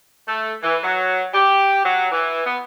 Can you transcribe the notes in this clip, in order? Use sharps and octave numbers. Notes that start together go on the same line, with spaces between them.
A3
E3
F#3
G4
F#3
E3
B3